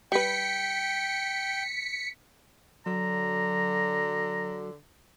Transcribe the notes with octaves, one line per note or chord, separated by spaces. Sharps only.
G3 B4 G5 B6 C#7
D3 F#3 A#5